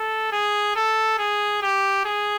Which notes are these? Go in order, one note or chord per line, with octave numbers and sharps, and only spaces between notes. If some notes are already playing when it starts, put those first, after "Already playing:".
Already playing: A4
G#4
A4
G#4
G4
G#4